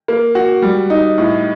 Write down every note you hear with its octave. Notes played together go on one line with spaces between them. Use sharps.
A#3
F#4
G3
D#4
A2